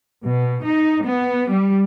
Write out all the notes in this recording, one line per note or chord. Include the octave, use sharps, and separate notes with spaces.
B2
D#4
B3
G3